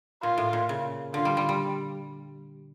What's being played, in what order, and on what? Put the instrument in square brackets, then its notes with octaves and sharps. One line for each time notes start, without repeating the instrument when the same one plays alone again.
[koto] A#2 [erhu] F4
[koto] A2
A#2
C#3
[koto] D3 [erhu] F4
[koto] G3
G3
G3